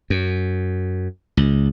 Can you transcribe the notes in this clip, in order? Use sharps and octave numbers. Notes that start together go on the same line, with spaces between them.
F#2
C#2